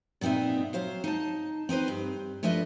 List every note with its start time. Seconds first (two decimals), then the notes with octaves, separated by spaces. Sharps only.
0.21 A#2 B3 C4 D#4 E5
0.73 F#3 C5 F5
1.04 D#4 A5
1.69 C4 D#4 B4 C5
1.88 G2
2.43 F3 A3 D4 B4 D#5 E5